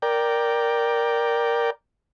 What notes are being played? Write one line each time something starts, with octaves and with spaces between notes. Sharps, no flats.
A#4 D5 G5